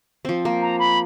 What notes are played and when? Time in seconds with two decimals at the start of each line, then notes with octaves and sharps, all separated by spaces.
0.25 F3 C4
0.45 A#3
0.62 A#5
0.79 B5